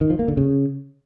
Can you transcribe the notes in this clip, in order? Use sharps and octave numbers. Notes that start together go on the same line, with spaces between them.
D#3
F3
A#3
D3
C#3